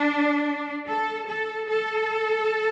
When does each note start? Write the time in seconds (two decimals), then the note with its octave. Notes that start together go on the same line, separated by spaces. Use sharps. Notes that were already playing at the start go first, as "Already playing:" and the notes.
Already playing: D4
0.88 A4
1.28 A4
1.68 A4